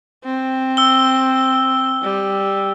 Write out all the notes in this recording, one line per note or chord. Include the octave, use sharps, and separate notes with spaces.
C4
E6 G7
G3